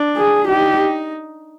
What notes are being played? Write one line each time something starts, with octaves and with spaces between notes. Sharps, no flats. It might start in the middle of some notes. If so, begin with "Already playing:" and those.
Already playing: D4
G#4
D#4 G4